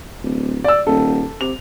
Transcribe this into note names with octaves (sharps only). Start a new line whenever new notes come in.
D1
D5 E6
D#1 A4
C3 F7